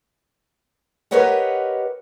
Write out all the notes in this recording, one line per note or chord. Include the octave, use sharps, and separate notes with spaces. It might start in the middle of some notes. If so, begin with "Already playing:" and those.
G4 A#4 B4 C#5 D#5 F#5